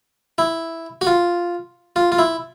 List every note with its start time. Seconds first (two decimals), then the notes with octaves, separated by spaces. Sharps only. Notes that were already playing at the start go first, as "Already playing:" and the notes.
0.38 E4
1.01 F#4
1.07 F4
1.96 F4
2.12 F4
2.19 E4